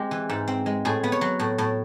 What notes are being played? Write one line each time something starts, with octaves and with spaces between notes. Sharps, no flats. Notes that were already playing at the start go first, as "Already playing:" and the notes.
Already playing: G#3 C4 G4
E3
G#2
C4
G#3
A2 G#4
B3
C#5
F#3
A2
A2